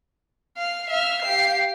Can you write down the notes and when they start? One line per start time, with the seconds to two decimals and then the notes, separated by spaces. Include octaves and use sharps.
0.58 F5
0.90 E5 F5 F6
1.23 G4 C7